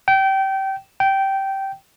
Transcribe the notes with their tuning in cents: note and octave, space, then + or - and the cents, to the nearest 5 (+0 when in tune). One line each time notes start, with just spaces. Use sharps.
G5 -25
G5 -15